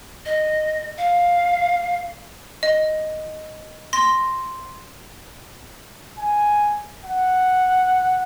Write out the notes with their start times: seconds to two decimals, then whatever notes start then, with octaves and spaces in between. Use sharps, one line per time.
0.26 D#5
0.98 F5
2.63 D#5
3.93 C6 A#6
6.19 G#5
7.05 F#5